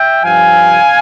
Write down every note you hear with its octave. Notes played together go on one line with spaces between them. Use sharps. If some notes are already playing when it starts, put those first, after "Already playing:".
Already playing: E5 G5
G2 F3 F5 G#5